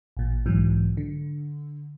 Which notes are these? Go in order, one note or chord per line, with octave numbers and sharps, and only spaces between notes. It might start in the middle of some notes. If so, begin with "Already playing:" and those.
A1 A#2
B1 G#2 E3 F#3
D3